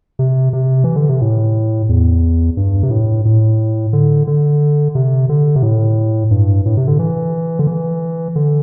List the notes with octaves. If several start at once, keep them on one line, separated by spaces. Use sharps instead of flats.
C3
C3
E3
D3
C3
A2
E2
G2
C3
A2
A2
D3
D3
C3
D3
C3
A2
G2
A2
C3
D3
E3
D3
E3
D3